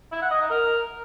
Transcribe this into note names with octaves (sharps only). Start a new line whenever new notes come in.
E4
F#5
D#5
D#4
A#4